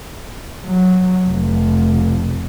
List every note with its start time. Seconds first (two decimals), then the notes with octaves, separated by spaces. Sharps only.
0.65 F#3
1.28 F1